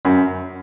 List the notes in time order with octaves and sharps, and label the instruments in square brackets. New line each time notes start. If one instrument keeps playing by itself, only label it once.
[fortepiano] F#2